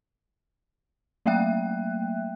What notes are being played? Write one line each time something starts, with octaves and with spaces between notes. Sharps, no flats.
F#3 A3 A#3 E5 G5 F#6